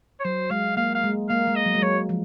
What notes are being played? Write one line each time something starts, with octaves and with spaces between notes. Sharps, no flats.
C#5
F#3 C5
G#3 F5
A#3 F5
F5
G#3
A#3 F5
G#3
D#5
F#3
G#3
F#3 C#5
F3